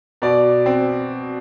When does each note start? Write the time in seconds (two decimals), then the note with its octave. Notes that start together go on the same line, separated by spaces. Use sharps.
0.22 B2 D5
0.66 C4